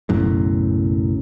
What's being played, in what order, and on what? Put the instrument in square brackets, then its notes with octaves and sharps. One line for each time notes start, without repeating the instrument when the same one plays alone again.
[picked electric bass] F#1 B1 F#2 A2